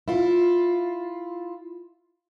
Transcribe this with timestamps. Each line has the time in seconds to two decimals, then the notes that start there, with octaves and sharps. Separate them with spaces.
0.08 E4 F4